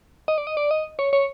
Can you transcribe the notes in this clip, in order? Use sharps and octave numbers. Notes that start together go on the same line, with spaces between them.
D#5
D5
D#5
D5
D#5
C#5
C#5